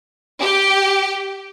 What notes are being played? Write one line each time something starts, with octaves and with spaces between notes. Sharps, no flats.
G4